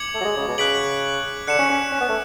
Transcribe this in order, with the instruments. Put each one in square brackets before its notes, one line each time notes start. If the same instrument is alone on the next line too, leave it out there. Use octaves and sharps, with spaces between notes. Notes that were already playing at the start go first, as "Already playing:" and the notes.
Already playing: [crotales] D6 G#6 C#7 F#7
[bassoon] A3
F#3
G#3
C#3
B2
[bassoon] C#3 [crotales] F#6 B6 D7 F#7
[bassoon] D3 [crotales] F#6 C#7 E7
[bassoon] C#4
C#4
C#4
B3
A3